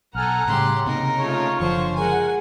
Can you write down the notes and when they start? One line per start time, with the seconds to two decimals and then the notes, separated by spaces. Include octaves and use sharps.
0.15 B1 A4 F#5 G#5 A#5 F6
0.48 A2 C#3 G3 G4 C6
0.86 C3 A#3 C4 D#4 A#4
1.18 C#3 A3 F4 C#5
1.60 F#1 D3 F3 C5 C#6
1.96 G#3 A#4 F#5 G#5